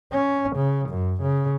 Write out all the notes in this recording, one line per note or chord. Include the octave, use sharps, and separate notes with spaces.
C#4
C#3
F#2
C#3